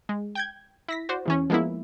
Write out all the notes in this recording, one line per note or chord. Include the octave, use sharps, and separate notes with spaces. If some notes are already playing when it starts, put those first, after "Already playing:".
G#3
G5 G6 G#6
E4 A#6 B6
F#4 C5 D5
E2 E3 C#4
F3 G#3 A#3 B3 E4